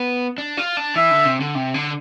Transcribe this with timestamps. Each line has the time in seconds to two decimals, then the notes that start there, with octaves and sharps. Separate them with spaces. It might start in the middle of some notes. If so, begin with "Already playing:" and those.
Already playing: B3
0.38 D4
0.57 F4
0.77 D4
0.96 E3 E5
1.11 D3
1.25 C3
1.40 D3
1.55 C3
1.74 D3